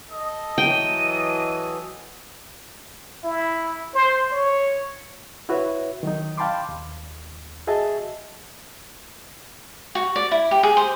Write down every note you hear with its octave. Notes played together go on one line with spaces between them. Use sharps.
A4 D#5
E3 F#3 G5 D#7
E4
C5
C#5
E4 F#4 B4 C#5 E5
D#3 F#3 D#4
F5 G5 A5 B5 C6 D6
D#2
F#4 G#4 D#5 E5 A5
F#4
D5
E4
G4
G#4
C5